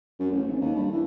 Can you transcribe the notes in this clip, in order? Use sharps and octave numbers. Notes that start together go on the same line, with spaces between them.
F#2
A1
G#1
D#2
G2
E3